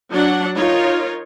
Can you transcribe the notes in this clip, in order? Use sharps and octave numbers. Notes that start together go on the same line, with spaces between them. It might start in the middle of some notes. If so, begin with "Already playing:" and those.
F#3 D4 F#5
D#4 F4 A#4 C#5